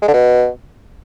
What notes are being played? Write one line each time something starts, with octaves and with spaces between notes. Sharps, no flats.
G#3
D3
B2